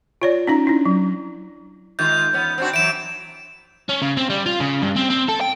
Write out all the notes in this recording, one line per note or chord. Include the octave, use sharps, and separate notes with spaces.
F4 C#5 D5
C#4 D#4 A#5
D4 E4
F#3
D#3 G#3 F4 G6
E2 B3 C#4
C4 D4 F#4
E3 F#3 D7 E7
C#4
C#3
C4
G3
F4
C#3
G2
C4
C4
A4
G5